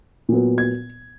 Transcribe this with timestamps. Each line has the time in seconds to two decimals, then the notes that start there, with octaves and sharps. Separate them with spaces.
0.29 A#2 F#3 B3
0.58 G#6